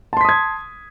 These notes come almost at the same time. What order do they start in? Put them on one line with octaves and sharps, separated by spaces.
A5 C6 B6 D#6 G#6